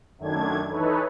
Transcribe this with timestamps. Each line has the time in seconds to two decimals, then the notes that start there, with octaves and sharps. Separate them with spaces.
0.18 F#2 D#3 A3 D4 G#6
0.71 E3 D#4 A4 B4 C#5